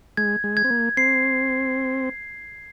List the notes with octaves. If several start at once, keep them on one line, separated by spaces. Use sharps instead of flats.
G#3 G#6
G#3
G#6
C4
A#3
C4 C7